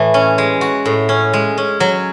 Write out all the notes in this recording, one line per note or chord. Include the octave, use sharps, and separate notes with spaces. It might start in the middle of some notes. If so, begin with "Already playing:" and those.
Already playing: A2 E3 A3
C#4
G#3
F#4
A2
C#4
G#3
C#4
F#3